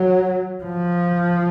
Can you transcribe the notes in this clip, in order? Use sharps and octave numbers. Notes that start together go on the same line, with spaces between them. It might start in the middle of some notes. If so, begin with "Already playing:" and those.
Already playing: F#3
F3